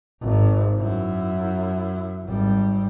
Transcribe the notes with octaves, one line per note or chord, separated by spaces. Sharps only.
G#1 G#2
F#2 E4
G#1 G3